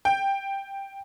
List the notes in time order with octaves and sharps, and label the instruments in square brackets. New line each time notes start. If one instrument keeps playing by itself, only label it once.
[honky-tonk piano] G5